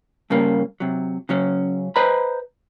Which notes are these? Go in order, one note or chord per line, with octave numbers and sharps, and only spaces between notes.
G2 C#3 G3 A#3
C3 F#3
C#3 F#3 C#4
B4 C5 D#5 A#5 B5